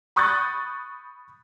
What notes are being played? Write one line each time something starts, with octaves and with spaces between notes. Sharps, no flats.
B5 C#6 D#6 F#6 G6 A6